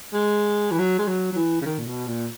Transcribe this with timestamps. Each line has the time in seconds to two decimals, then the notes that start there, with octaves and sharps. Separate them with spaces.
0.13 G#3
0.71 E3
0.79 F#3
0.99 G#3
1.08 F#3
1.32 F#3
1.36 E3
1.61 C#3
1.65 D#3
1.79 A#2
1.86 B2
2.07 A#2